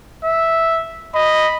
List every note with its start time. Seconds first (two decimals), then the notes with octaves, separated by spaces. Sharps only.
0.24 E5
1.15 D#5 B5